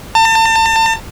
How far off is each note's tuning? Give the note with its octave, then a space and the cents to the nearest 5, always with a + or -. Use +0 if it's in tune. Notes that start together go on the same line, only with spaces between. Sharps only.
A5 +35